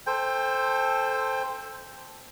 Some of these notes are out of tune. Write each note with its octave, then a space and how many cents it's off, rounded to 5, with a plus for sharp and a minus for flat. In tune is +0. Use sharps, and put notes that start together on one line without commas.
A4 +0 C5 +0 G5 +30